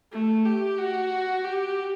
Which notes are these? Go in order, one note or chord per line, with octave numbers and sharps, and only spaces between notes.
A3
G4
F#4
G4